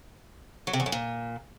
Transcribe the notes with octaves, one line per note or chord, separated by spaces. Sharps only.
F#3
C3
E2
F#2
A#2